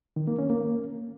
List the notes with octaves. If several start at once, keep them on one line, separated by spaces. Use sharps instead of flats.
D#3
A#3
C#4
A#3